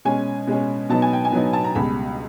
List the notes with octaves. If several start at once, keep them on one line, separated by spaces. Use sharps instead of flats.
B2 G#3 C#4 G#5
B2 G#3 C#4
B2 F#3 B3 D#4 A5
G#5
G5
G#5
B2 F#3 B3 D#4
A5
A#5
C#2 B2 G3 B5